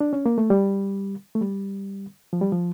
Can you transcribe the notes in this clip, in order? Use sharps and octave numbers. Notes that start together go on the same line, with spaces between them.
D4
C#4
A#3
A3
G3
A3
G3
F3
G3
F3